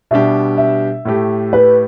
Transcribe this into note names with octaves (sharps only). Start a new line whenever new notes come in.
B2 G3 D4 G4 E5
E5
A2 A3 G4
B4